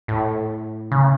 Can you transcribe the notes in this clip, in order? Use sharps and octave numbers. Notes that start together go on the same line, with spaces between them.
A2
C#3